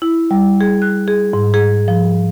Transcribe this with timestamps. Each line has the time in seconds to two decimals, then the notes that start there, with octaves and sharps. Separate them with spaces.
0.02 E4
0.31 G3
0.61 G#4
0.82 F#6
1.08 G#4
1.33 G#2
1.54 G#4
1.88 F3